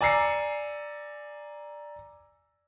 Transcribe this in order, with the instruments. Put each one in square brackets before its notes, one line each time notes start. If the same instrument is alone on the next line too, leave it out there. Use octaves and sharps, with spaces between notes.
[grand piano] D5 G#5 A#5 E6 C7 C#7